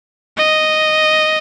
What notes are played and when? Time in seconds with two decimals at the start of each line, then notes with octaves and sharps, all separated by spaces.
0.37 D#5